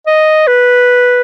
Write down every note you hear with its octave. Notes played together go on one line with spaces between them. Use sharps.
D#5
B4